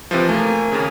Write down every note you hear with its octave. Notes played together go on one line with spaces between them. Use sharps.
C3 E3 F3
A3 A#3 G#5
D#2 C#3